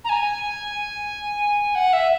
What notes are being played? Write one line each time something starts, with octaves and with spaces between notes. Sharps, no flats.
A#5
G#5
F#5
E5